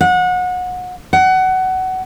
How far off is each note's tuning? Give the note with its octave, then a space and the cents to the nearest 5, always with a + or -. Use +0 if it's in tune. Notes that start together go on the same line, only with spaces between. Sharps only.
F#5 -30
F#5 +20